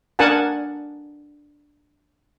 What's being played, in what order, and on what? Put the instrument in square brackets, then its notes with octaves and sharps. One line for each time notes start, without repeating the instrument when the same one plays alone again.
[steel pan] D4 A#4 F#5 G#5 A5